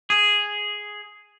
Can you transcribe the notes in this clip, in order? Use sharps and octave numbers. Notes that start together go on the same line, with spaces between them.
G#4